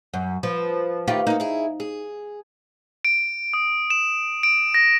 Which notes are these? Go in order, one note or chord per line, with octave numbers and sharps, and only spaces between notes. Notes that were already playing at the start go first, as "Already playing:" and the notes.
F#2
F3 B4
D#3 A3 F4 G4 B4
A#3 D#4 F#4
E4 G#4
G#4
D7
D#6
E7
D7
A#6